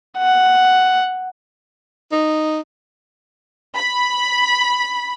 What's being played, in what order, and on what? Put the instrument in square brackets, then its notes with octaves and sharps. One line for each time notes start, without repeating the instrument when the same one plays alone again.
[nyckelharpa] F#5
[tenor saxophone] D#4
[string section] B5